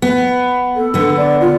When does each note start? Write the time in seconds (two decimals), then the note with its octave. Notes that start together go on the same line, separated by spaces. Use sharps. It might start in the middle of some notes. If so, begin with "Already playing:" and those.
0.02 B3
0.76 A4
0.94 D3 B3
1.17 D5
1.41 F4